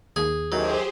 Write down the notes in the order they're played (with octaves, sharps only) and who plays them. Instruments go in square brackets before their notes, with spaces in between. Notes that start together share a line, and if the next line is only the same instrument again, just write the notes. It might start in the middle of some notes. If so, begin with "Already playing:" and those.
[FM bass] D#2 [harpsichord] G#4
[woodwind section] F#2 A2 D#3 [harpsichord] F#3 [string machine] G4 G#4 C5